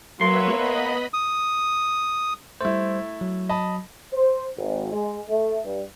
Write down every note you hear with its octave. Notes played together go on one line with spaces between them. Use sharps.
F#3 A#3 B4 C#5 E5 C6
B3 D#5 B5
D#6
G3 A3 E4 C5
F#3
D#5 A5 B5
C5
G#1
G#3
A3
G2